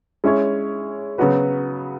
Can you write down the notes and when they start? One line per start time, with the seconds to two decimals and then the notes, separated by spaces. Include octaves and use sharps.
0.24 G#3 C#4 E4 G#4 C#5
1.18 C#3 F#3 B3 F#4 B4